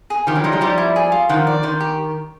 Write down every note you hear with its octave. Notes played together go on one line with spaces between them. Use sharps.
G#4
D#3 F3 G4
E3 F#3
F3 G3 D#4
F#3 G#3
F3 G3 G4
E4
G#4
F4
D#3 F3 F#5
D5
D#3 C5
G4